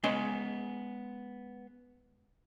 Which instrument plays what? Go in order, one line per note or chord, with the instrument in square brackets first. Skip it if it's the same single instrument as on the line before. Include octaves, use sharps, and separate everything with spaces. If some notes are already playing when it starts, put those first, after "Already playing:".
[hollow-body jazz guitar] G#3 B3 C#4 C6